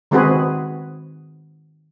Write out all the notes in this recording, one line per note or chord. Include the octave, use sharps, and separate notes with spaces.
D#3 G#3 C4 F#4 G#4 B4